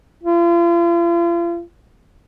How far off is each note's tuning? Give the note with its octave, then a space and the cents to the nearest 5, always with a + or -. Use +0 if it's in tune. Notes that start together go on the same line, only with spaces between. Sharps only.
F4 -40